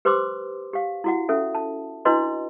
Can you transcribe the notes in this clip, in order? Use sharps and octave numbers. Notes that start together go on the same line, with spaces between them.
G4 B4 C5 C6 D6 E6
G4 F5
E4 F#4 F#5
C#4 A4 E5
A5
D4 E4 F#4 B4 D#5 C6